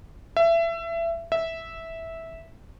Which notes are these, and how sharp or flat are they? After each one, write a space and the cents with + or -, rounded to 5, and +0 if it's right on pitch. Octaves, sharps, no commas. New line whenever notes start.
E5 +25
E5 -10